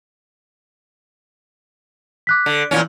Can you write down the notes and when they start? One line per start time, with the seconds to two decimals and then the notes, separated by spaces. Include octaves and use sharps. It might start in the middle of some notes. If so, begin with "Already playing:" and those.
2.27 D6 F#6 B6
2.46 D3
2.71 E2 A#2 C#4